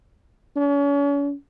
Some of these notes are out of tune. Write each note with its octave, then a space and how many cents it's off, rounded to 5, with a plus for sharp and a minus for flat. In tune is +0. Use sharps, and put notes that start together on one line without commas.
C#4 +40